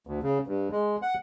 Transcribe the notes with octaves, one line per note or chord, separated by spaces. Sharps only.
D2
C#3
G2
G#3
F#5